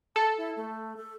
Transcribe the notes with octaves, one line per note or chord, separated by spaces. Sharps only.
A4 A5
E4
A3
A4